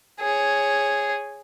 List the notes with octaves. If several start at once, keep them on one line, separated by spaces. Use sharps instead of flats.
G#4 C#5